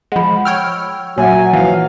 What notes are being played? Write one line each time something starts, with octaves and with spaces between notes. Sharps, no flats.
F3 G#3 F#5 B5
C#5 G5 E6 F6
A#2 F#3 C#5 E5 F#5 G#5
E3 F3 F5